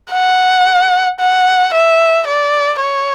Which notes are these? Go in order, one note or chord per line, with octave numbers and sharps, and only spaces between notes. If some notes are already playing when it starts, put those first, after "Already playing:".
F#5
F#5
E5
D5
C#5